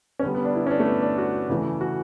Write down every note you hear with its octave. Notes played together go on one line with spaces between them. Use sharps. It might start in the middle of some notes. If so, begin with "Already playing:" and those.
C#4
D3 G3 B3
B3
D4
E4
C#4
D4
A3
B3
D4
F#4
C#3 E3 A3
F#4